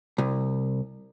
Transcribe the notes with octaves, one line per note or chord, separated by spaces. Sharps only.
C2